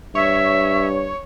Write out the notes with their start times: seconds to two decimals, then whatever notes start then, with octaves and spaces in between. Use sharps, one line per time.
0.15 G2 C#5 E5